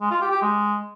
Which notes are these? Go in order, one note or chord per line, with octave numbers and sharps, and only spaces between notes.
G#3
F4
G4
G4
G#3